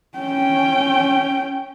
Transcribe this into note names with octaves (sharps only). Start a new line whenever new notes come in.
C#4 G5